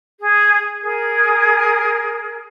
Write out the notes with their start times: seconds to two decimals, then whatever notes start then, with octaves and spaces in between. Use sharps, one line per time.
0.19 G#4
0.81 G#4 A#4